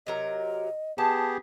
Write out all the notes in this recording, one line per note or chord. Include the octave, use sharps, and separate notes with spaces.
C3 F#3 A#4 D#5
B3 G4 G#4 A5